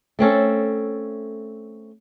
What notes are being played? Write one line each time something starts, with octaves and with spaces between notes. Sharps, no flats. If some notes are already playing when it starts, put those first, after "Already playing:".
A3 C4 C#4 A4